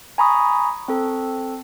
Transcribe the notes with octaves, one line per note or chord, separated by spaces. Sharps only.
G#5 A#5 B5 C#6 D#6
C4 A4